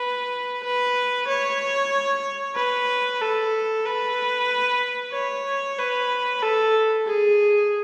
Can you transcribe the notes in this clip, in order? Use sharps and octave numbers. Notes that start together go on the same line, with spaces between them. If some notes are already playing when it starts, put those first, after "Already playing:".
Already playing: B4
B4
C#5
B4
A4
B4
C#5
B4
A4
G#4